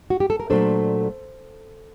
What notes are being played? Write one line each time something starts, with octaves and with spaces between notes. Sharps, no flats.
F#4
G4
A4
A#4
A#2 F#3 A3 D4 A4 C5